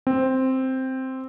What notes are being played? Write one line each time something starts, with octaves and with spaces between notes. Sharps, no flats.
C4